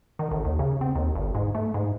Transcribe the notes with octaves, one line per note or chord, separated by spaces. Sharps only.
D#3
A1
D#2
C#3
C4
D#2
G1
G#2
A3
G#2